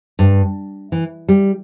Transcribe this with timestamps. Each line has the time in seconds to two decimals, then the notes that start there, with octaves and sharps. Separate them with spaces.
0.19 G2
0.92 E3
1.29 G3